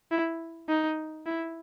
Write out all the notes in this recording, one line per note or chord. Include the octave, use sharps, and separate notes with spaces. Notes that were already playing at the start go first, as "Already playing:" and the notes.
E4
D#4
E4